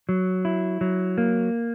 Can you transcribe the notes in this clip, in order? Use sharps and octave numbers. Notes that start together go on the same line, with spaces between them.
F#3
E4
F#3
A#3